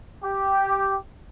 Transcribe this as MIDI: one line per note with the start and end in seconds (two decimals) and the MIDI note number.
0.23 0.95 67